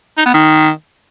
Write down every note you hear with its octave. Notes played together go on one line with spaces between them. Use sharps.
D#4
B3
D#3